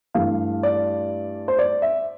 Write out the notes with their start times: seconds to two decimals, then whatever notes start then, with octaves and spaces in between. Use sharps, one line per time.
0.14 G2 E3 A3 F5
0.63 D5
1.48 C5
1.59 D5
1.82 E5